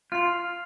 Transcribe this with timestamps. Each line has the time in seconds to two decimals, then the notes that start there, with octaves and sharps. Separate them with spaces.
0.12 F4 F6 C7 F7